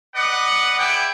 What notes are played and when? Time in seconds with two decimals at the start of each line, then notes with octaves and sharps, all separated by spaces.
0.15 B4 D5 D#5 F#5
0.78 E4 G#4 D5 G5